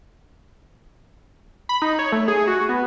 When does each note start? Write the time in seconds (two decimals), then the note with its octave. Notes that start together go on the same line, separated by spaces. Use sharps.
1.69 B5
1.82 D#4
1.99 C#5
2.12 A3
2.28 G#4
2.47 F#4
2.69 B3